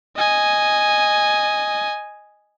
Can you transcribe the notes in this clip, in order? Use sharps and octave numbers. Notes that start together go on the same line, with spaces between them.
D#5 G#5